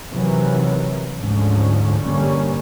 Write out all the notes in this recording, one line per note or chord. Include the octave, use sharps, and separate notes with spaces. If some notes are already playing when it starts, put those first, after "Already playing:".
C3 D#3 E3 F#3
D2 G#2 D3 F3 C#4
A#1 G2 D3 G3 A#3 C#4